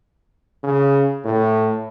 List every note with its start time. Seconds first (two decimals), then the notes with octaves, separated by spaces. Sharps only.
0.64 C#3
1.25 A2